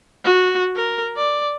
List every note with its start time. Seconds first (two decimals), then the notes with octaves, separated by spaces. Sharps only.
0.24 F#4
0.76 A#4
1.17 D5